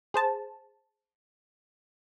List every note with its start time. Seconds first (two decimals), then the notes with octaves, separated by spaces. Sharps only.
0.14 G#4 C5 A5